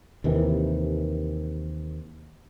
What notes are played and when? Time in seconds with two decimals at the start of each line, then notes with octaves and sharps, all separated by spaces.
0.24 D#2 C3 D#3 E3